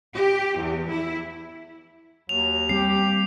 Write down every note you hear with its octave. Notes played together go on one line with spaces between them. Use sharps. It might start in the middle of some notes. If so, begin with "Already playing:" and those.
G4
E2
E4
D#2 F#3 F7
G3 C4 G4 C7